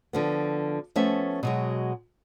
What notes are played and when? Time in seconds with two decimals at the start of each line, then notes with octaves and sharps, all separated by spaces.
0.13 D3 F3 B3
0.96 F3 A3 B3 C#4 E5
1.43 B2 F#3 G#3